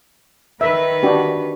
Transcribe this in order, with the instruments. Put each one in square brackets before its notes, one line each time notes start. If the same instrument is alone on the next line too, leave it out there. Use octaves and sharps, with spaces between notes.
[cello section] D#3 B4 [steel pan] E5
[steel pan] D4 F#4 G4